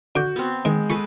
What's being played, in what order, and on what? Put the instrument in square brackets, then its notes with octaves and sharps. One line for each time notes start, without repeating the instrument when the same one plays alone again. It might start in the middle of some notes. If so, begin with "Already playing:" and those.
[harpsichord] D3 D6 [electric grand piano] F#4 G6
[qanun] B3 C4
[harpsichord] D#3 [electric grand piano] G#3
[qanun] G#4 A4 B4 [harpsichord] C#6